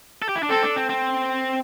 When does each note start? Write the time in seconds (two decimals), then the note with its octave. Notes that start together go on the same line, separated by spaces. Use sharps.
0.22 A4
0.29 G4
0.35 E4
0.43 D4
0.50 C4 A4
0.63 D4
0.76 C4
0.89 C4